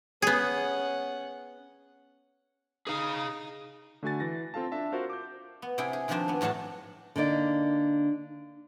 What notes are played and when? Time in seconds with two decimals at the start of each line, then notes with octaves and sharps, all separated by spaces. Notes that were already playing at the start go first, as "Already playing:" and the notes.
0.22 B3 C#4 G#4 F#5
2.87 D#4 G#4 F5
4.03 D3 A3 F#4 G#5 A6
4.20 E3 A#6
4.54 C4 F4 A4 F5 A5
4.72 D4 E5 A5
4.92 F4 F#4 A#4 C5 F5
5.10 D6 G6
5.62 B3
5.78 C3 E4 G#4 G5
5.93 G#4
6.08 C3 D#3 F3 C4 D4 C5
6.28 B3 D4
6.41 E2 A2 F#3 D4 A5
7.16 D3 A#3 D#4 D5